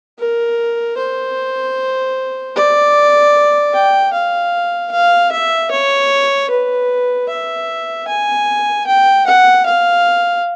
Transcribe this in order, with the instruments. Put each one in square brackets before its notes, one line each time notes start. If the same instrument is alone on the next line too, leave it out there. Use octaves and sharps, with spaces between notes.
[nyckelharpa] A#4
C5
D5
G5
F5
F5
E5
C#5
B4
E5
G#5
G5
F#5
F5